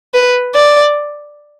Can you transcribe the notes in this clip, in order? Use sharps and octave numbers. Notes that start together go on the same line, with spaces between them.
B4
D5